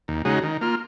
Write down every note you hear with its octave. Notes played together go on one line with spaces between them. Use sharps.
D#2
C#3 G#3 D#4 F#4
D#3
A#3 F4